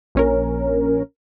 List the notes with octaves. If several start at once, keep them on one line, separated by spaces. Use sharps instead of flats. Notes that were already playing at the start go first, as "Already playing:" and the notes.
A#1 C#4 A#4